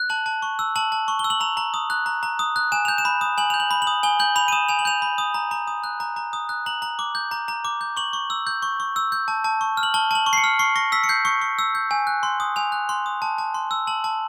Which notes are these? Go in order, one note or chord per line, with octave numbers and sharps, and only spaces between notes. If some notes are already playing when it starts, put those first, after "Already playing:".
Already playing: F#6
A5 F#7
A5
C#6
E6
A5 F#7
A5
C#6
G7
E6
F#7
A#5 F7
A#5
D#6
F#6
A#5
A#5
D#6
F#6
G#5 E7
G6 F7
E7
B5
D#6
G#5 F#7
G6 F7
F#7
B5
F#7
D#6
G#5 G7
G6 F#7
B5 F7
D#7
D#6 E7
G#5 F7
F#7
G6 F7
B5
D#6
A#5
A#5
D#6
F#6
A#5
A#5
D#6
F#6
A#5 F#7
A#5
D6
G6
A#5
A#5
D6
G6
C#6 F#7
C#6
E6
G6
C#6
C#6
E6
G6
A5
A5
C#6
F6
F#7
A5 G7
A5 F#7
C#6
C7
C#7
F6
C#6 C7
C#6 A#6
E6 B6
C#7
G6 C7
C#6 C#7
C#6
E6
G6
G#5
F#6
C6
D#6
G#5 F7
F#6
C6
D#6
A5
A5
C6
E6
A5 F#7
A5